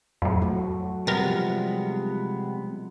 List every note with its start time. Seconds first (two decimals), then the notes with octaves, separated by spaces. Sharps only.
0.22 F2 A2 F#3
0.42 F#3 A3 F#4
1.07 C3 F3 G3 G#3 B3 A#4 A6